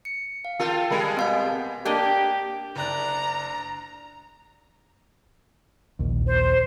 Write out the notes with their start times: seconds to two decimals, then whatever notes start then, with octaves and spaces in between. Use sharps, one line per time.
0.05 C#7
0.45 F5
0.60 F4 A4 A#4 G5
0.90 G3 G#3 A#4
1.17 B2 C4 F5 G6
1.85 A#3 D4 G4 D#5
2.76 F#1 D4 A#5 F#6
5.99 A#1 D#2
6.26 C5